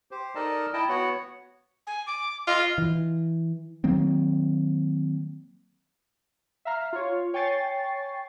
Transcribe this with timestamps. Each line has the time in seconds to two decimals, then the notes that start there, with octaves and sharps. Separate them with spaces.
0.11 G4 C5
0.35 D#4 A4 A#4 D5 D#5 A5
0.73 E4 D#5 G5 A5
0.89 B3 F#4 C#5 F#5
1.87 G#5
2.07 D6
2.47 F4 D#5
2.78 E3
3.84 D#3 F#3 A#3 C4
6.65 E5 F5 A#5 F6
6.93 F4 C#5
7.34 C#5 G5 G#5 C#6 A6 C7